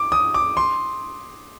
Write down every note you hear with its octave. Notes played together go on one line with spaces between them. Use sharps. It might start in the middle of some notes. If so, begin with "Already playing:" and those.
Already playing: D6
D#6
D6
C6